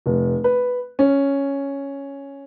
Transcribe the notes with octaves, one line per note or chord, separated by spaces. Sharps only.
F1
B4
C#4